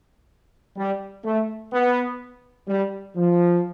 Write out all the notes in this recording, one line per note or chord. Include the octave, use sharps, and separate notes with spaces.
G3
A3
B3
G3
F3